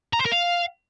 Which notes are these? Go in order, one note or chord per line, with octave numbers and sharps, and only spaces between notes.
A#5
C5
A#4
F5